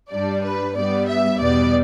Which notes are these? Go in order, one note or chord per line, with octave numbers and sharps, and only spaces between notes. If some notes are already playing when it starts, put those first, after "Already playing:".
G2 G3 D4 D5
B4
G2 G3 B3 D5
E5
E2 B2 G3 B3 D5